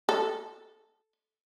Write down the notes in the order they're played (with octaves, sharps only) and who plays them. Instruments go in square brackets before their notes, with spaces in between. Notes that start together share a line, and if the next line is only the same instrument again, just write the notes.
[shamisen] A4